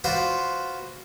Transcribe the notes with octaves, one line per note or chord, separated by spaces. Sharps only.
F4 F#4 B4 C5 D5 F5